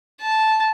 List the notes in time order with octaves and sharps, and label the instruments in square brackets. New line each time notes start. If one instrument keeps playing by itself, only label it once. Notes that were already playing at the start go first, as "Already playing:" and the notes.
[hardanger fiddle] A5